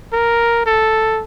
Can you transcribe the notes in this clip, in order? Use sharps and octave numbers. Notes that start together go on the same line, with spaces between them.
A#4
A4